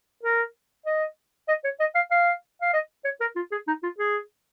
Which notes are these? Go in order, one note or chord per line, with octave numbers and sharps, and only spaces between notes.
A#4
D#5
D#5
C#5
D#5
F5
F5
F5
D#5
C#5
A#4
F4
G#4
D#4
F4
G#4